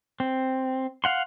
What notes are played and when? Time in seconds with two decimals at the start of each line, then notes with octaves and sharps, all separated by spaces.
0.20 C4
1.04 F5 F#5 C6